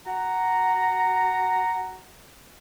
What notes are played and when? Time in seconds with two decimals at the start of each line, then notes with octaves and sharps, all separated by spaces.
0.07 F#4 F#5 A#5